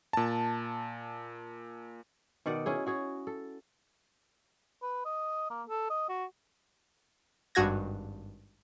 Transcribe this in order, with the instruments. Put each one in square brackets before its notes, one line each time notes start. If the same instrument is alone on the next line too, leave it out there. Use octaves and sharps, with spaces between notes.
[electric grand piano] A#2 A5
[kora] B2 D#3 D5 F#5
C#4 E4 G#4
F#4 G#4 C#5
A4
[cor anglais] B4
D#5
A#3
A4
D#5
F#4
[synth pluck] G#1 G2 F#4 G#6 A#6